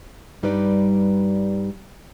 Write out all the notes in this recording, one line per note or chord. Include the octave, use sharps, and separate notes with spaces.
G2 G3 D#4 B4 D5